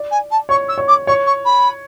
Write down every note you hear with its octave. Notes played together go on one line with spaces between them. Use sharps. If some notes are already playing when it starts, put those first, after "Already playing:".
Already playing: D5
G#5
A5
C#5 C#6
E6
C#5
D6
C#5 C#6
C#6
B5